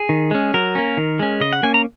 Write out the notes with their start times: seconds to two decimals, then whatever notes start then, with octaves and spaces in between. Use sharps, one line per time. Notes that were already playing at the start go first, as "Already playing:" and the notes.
Already playing: G#4
0.09 D#3
0.31 G#3 C#4
0.54 F#3 A#4
0.75 A#3 C#4
0.97 D#3
1.19 G#3 C#4
1.40 C#3 D#5
1.53 F#5
1.63 A#3 C#4 G#5
1.74 A#5